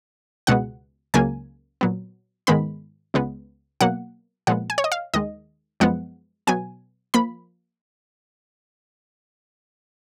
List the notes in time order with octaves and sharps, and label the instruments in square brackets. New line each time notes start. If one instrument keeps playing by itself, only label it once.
[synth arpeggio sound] C#2 B2 G#3 B3 F#5
C#2 C#3 F#3 A#3 G#5
A#2 F#3 B3
G#2 D#3 G#3 B3 B5
C#2 C#3 G#3 B3
B2 F#3 A#3 F#5
A#2 F3 G#3 B3 F#5
G#5
C#5
D#5
F5
D#2 D#3 G#3 D#5
F#2 F3 G#3 B3 F#5
B2 F#3 B3 G#5
F3 A#3 B5